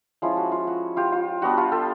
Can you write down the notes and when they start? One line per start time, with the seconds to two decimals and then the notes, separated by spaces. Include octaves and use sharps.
0.22 F3 G#3 C#4 E4 F4
0.37 F#4
0.52 F4
0.67 F#4
0.97 F4 G4
1.12 F4
1.42 G3 B3 D4 F#4
1.57 F4 G4
1.72 G4 A4